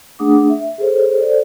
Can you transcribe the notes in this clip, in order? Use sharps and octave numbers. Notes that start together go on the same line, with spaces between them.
A3 D4 G#4 F#5 D6 D#6
E5
G#4 A4 C5 C#5
A4 C5 D5